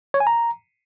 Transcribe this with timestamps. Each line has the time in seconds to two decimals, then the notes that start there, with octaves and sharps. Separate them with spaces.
0.14 C#5
0.20 G#5
0.27 A#5